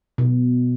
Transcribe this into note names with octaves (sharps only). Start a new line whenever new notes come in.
B2